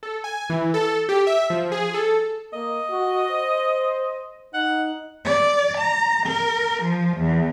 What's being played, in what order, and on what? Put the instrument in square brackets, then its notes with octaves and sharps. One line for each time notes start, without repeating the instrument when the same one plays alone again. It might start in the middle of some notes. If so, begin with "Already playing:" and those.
[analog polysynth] A4
G#5
E3
A4
G4
E5
F3
G#4
A4
[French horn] A#3 [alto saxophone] D#5
[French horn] F#4
C5
[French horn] D#4 [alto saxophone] F#5
[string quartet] D5
A#5
A#4
F3
E2